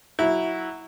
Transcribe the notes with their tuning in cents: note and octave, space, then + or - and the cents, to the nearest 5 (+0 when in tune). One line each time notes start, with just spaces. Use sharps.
F#3 +0 E4 -10